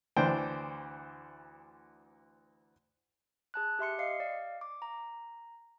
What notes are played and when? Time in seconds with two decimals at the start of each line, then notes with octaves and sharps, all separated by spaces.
0.17 D2 E3 D4 C5 G5
3.54 G#4 A5 F#6
3.79 G4 E5 C6 C#7
3.99 D#5 F5 C7 C#7
4.20 D5 F5
4.61 D6
4.82 A#5